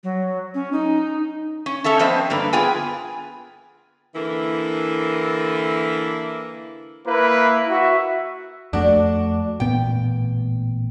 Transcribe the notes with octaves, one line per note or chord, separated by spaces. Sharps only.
F#3
C#4
D#4
C#4
C#4 A4 E5 A5
F3 B3 C4 C5 D#5 E5
G2 D3 A#3 B4
B3 F4 G#4 B4 G5 G#5
D3 E3 A#3 E4
A#3 E4 B4
F#4 E5
F2 A3 D4 F#4
A1 A#2 B3 G5